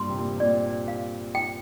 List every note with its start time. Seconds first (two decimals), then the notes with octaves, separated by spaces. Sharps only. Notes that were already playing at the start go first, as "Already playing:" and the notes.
Already playing: G2 A#2 C6
0.09 C3
0.17 A#2
0.36 C3
0.40 A#2 D5
0.88 F5
1.35 G5